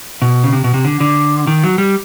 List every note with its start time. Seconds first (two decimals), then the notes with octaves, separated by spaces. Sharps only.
0.22 B2
0.44 C#3
0.53 C3
0.64 B2
0.74 C3
0.85 D3
1.00 D3
1.47 D#3
1.64 F#3
1.78 G3